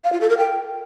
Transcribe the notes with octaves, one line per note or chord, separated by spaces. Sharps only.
F5
F4
A4
A#4
G5